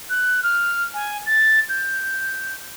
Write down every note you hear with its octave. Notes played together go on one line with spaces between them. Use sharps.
F#6
F6
G#5
A6
G6